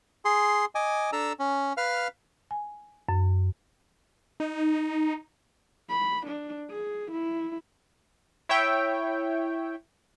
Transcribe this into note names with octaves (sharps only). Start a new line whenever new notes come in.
G#4 C6
D#5 G#5 D6
D4 A4 A#5 E6
C#4
B4 F5 F6
G#5
F#2
D#4
B5
D4
G#4
E4
E4 C#5 E5 G5